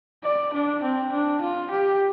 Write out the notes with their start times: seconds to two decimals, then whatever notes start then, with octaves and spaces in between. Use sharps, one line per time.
0.24 D5
0.54 D4
0.83 C4
1.13 D4
1.42 F4
1.71 G4